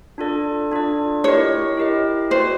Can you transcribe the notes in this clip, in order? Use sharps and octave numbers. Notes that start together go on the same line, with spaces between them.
D4 F4 A4 D5
D4 F4 A4 D5
E4 G4 A#4 C#5 D#5
E4 G4 A#4 D#5
F#4 B4 C5 D5